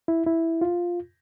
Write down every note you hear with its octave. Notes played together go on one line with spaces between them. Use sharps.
E4
E4
F4